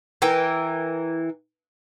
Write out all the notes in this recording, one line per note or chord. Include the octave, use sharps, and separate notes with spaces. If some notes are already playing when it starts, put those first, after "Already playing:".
E3 A#4 G5